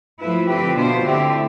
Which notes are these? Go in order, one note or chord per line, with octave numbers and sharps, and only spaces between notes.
F3 A3 E4 B4
D3 F3 C4 G4 B4
B2 B3 D4 F4 C5
D3 A3 C4 E4 G4